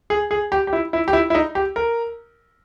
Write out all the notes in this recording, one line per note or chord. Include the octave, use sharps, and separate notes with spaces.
G#4
G#4
G4
G4
E4
E4
G4
E4
E4
D#4
G4
A#4